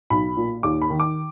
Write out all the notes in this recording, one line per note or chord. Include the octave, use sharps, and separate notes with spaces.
B1 B5
A#2
D#2 D6
B5
D#3
D6